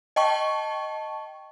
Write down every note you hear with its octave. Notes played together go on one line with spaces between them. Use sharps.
D#5 G5 A5 C#6